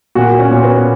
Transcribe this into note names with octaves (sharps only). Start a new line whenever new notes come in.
A#2 F#4
C#4
A#2
B3